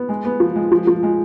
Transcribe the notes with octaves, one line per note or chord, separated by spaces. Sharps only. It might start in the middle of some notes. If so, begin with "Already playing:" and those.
Already playing: B3
G#3
B3
F3
G#3
F3
F3
G#3